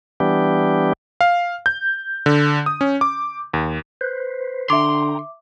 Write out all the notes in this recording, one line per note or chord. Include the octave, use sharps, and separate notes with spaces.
E3 G3 B3 D4 G4
F5
G6
D3
D#6
C#4
D6
D#2
B4 C5
D3 E5 G5 A#5 C6 D6